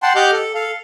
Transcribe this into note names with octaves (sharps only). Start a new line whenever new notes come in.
F#5 G5 A5 C6
G4 D#5 F#5 D6 F6 G6
A4
A4 F5